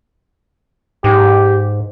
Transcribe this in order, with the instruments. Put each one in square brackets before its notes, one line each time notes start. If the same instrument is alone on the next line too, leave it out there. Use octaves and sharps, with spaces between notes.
[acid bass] G#2 [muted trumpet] G4